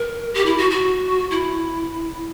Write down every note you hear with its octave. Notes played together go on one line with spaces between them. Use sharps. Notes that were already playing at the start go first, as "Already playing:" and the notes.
Already playing: A#4
G4
E4
F#4
F#4
E4